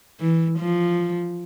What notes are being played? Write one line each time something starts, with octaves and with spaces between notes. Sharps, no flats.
E3
F3